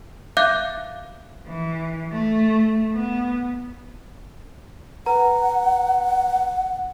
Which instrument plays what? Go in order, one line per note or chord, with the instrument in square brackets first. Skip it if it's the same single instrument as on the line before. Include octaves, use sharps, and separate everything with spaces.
[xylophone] E5 F5 D6 F#6 G6
[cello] E3
A3
B3
[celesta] B4 A#5 [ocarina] F#5